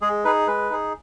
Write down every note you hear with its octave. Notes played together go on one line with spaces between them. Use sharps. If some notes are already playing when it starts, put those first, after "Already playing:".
G#3 G#4
D#4 G#4 B4
G#3 B4
D#4 G#4